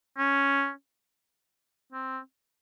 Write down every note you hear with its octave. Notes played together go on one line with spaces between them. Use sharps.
C#4
C4